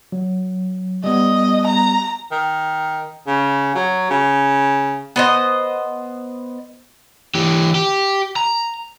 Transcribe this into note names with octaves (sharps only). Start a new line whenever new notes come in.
F#3
G3 B3 D#5
A#5
D#3
C#3
F#3
C#3
B3 C5 D#5
E3 G4
G4
A#5